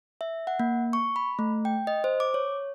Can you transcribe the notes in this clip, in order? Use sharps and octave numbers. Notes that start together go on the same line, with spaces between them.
E5
F#5
A#3
C#6
B5
A3
G5
D#5
C5
D6
C#5